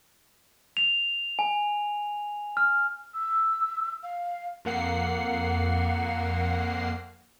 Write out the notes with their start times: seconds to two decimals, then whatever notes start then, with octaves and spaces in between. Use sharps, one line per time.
0.77 F7
1.39 G#5
2.57 F6
3.14 E6
4.03 F5
4.65 F2 A#3 F#5 C7